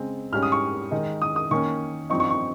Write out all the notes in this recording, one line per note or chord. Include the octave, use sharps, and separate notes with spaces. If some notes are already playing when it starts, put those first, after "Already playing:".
Already playing: C#3 G#3 C4
G#2 G3 C#4 F6
D#6
C#6
D#3 G#3 D#4
D#6
D#6
D#3 A#3 C#4 C#6
G2 F3 C4 D#4 C#6
C#6
C#6